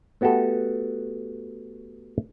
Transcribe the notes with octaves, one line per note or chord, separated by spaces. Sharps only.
A3 B3 F#4 G4 A4